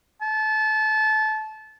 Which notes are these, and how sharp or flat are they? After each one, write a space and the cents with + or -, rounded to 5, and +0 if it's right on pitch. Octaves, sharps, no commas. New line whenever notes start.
A5 -25